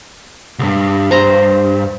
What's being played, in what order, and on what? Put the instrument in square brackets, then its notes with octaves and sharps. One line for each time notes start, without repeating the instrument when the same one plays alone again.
[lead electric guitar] C2 G2
[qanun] C5 A#5